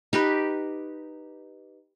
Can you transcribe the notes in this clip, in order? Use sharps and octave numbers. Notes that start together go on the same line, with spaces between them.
D#4 G4 B4